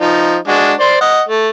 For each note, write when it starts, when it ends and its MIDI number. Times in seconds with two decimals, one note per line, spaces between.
0.01 0.37 53
0.01 0.37 63
0.48 0.72 56
0.48 0.72 62
0.48 0.72 66
0.80 0.96 72
0.80 0.96 74
0.80 0.96 84
1.01 1.22 75
1.01 1.22 78
1.29 1.50 57